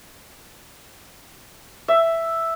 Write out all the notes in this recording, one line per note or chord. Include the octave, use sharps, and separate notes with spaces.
E5